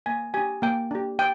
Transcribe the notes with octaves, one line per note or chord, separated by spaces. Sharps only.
A#3 G#5
D4 G4 G#5
A#3 G5
D4 G4
G5